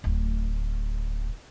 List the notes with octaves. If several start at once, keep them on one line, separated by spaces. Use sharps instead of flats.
D1 A2